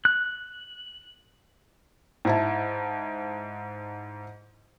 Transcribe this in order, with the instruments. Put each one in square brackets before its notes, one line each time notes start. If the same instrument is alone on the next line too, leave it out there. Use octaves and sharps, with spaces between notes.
[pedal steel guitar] F#6
[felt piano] G#2 E4 A5